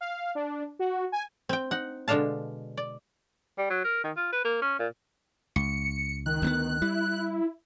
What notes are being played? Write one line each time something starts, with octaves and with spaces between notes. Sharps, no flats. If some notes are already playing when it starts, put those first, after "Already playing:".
F5
D4
F#4
G#5
C4 G5
D#4 F#5
B2 D3 G#3 D4 F5 A5
D5
G3
F#3
A#4
D#3
F4
B4
A#3
C#4
A#2
C#2 C#7
D#3 F#6
D2 A#3 B3
G3 E4